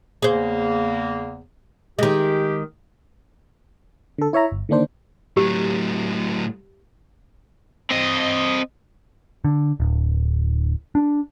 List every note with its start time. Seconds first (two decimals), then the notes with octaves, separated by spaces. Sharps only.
0.22 E2 C#3 A#3 G#4 C5
1.99 D#3 G#3 G4
4.19 D3 A4
4.33 E4 C#5 E5 A#5
4.51 G1
4.69 D3 D#3 A#3 D4 C5
5.37 A2 F#3 G4
7.91 C4 D#5
9.45 D3
9.80 D1
10.95 D4